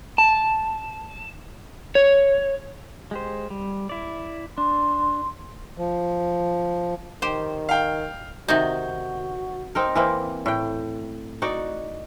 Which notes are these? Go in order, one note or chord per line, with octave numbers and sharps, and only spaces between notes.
A5
C#5
G#3 G4 C5
G3
E4 D5
D4 C6
F3
D#3 G4 C5
F5 G5
C3 D#3 D#4 F#4 G6
C4 D#4 A#4
E3 A#3 C4
A2 G5
D#4 F#4 D5